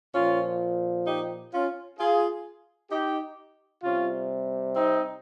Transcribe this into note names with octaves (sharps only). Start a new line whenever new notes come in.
A#2 F3 C#4 F4
D#4 G4
C#4 F4
F4 G#4
D#4 G4
C3 G3 C#4 F4
C4 D#4